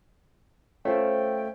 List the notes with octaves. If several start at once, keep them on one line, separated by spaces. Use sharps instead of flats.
A3 C#4 F4 A4 C5 E5 G5